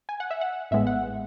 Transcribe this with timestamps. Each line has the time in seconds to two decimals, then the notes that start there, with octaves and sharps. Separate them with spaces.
0.09 G#5
0.20 F#5
0.31 E5
0.41 F#5
0.71 A1 A2 G#3 B3 E5
0.87 F#5